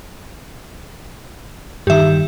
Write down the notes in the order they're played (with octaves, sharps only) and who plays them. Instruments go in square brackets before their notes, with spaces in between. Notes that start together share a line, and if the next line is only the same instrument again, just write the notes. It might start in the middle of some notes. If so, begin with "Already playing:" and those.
[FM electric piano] G2 D#3 [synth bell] G4 E5